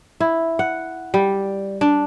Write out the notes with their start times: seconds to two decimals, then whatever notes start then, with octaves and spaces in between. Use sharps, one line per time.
0.20 E4
0.59 F#5
1.14 G3
1.81 D4